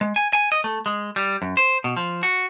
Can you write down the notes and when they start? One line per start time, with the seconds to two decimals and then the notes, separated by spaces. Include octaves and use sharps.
0.01 G#3
0.16 G#5
0.33 G#5
0.52 D#5
0.64 A3
0.86 G#3
1.16 G3
1.42 F#2
1.57 C5
1.84 B2
1.97 F3
2.23 F#4